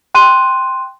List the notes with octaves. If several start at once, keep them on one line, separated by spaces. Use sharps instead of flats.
G5 C6 F#6 D#7